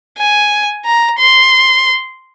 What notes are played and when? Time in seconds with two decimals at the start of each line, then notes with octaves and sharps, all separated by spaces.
0.18 G#5
0.85 A#5
1.19 C6